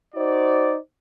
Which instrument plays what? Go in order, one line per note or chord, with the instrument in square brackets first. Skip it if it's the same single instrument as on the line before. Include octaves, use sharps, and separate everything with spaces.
[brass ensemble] D#4 F#4 C5 D5